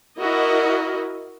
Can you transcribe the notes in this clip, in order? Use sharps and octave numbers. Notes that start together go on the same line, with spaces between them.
E4 F#4 A#4 D#5